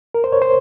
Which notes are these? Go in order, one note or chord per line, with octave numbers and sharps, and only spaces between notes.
A#4
C5
C#5
C5